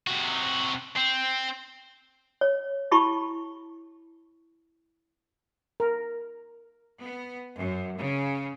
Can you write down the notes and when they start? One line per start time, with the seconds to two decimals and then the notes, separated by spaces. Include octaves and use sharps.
0.07 C3 F#4
0.96 C4
2.41 C#5
2.91 E4 G4 A5 B5 C#6
5.80 A#4
6.99 B3
7.60 F#2
8.00 C#3